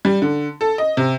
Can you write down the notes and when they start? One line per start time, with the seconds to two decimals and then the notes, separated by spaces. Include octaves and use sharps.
0.05 G3
0.22 D3
0.61 A4
0.78 D#5
0.97 C3